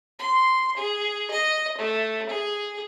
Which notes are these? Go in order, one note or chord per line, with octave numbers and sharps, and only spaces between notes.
C6
G#4
D#5
A3
G#4